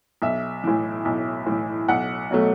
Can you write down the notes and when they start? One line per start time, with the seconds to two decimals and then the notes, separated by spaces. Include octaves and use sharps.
0.22 B1 E5
0.64 A2 E3
1.05 B1
1.46 A2 E3
1.88 B1 F#5
2.31 B2 F#3 A3